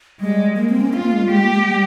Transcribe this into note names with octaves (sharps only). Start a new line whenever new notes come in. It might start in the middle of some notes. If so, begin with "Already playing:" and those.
G3 G#3
G#3 A#3
C4
C#4
C4 F4
A#3
G#3
G3
G#3 G4
A#3
G#3
G3